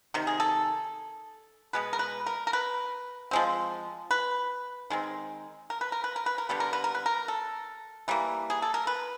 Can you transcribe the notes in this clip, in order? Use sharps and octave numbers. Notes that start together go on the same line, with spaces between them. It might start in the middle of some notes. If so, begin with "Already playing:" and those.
C3 D#3
G#4
A4
B2 G#3 B3 B4
A#4
B4
A#4
A#4
B4
F3 G#3 C4
B4
D#3 G#3 C4
A#4
B4
A#4
B4
A#4
B4
A#4
D3 G3 B3 B4
A#4
B4
A#4
B4
A#4
A4
E3 G3 A#3
G#4
A4
A#4
B4